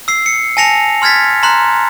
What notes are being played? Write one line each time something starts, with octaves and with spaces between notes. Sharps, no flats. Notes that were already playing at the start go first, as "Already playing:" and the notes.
E6 C7
C#7
G#5 A5 A#6 C#7 F7
C6 F6 G#6 A6 B6
A#5 C6 F#6